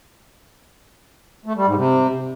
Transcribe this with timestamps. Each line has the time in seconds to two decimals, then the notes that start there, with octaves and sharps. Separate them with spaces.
1.46 A3
1.56 G3
1.66 G#2
1.77 C3